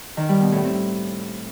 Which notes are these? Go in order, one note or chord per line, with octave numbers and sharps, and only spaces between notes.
D#3
G3
B2
A2
C4